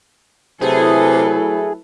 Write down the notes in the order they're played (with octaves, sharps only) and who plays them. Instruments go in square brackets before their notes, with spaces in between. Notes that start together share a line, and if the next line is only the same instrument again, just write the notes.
[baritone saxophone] C3 [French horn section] F#3 A3 E4 [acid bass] G#4 [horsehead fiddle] A4 B4